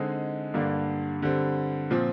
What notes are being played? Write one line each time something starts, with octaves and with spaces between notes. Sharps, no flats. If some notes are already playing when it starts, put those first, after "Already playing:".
Already playing: D3 G#3 C4 D#4 G#4
G2 D3 G3 A#3 D4
D3 G3 C4
A#2 F3 C4